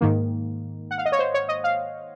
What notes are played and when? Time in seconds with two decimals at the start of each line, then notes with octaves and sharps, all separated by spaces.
0.01 G#2 D#3 A#3
0.91 F#5
0.98 F5
1.05 D#5
1.12 C#5
1.19 C5
1.34 C#5
1.49 D#5
1.64 F5